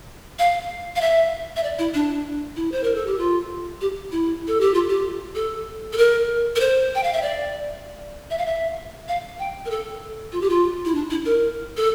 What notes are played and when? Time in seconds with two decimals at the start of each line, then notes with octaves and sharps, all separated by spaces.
0.39 F5
0.96 F5
1.01 E5
1.56 E5
1.63 D5
1.79 E4
1.94 D4
2.56 E4
2.72 C5
2.84 A#4
2.95 A4
3.07 G4
3.19 F4
3.81 G4
4.12 E4
4.47 A4
4.61 G4
4.74 F4
4.89 G4
5.35 A4
5.93 A4
5.98 A#4
6.56 A#4
6.60 C5
6.95 G5
7.03 F5
7.13 E5
7.22 D5
8.30 E5
8.38 F5
8.46 E5
9.08 F5
9.39 G5
9.66 A#4
9.70 A4
10.32 F4
10.41 G4
10.50 F4
10.85 E4
10.95 D4
11.10 E4
11.25 A#4
11.77 A4